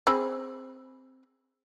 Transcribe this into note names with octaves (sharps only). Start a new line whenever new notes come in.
C4 G#4 B5